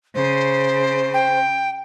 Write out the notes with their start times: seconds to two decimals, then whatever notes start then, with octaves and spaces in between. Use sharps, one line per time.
0.15 C#3 C5
1.14 G5